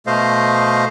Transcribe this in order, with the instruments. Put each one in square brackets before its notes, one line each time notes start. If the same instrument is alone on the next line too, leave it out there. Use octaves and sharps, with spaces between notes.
[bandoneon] B2 A3 C5 D#5 F5